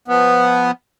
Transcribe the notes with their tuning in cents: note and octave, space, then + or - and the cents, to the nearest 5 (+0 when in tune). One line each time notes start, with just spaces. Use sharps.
F3 +0 B3 +0